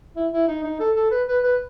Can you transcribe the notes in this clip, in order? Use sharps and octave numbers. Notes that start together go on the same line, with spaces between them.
E4
E4
D#4
D#4
A4
A4
B4
B4
B4